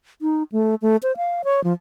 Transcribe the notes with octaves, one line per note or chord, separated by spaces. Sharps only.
D#4
A3
A3
C5
F5
C#5
F3